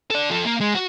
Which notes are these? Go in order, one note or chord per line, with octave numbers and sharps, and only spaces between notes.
A4 D5
F3 A4
A#3
G#3
F#4